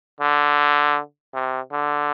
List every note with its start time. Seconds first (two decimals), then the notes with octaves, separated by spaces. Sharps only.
0.21 D3
1.34 C3
1.72 D3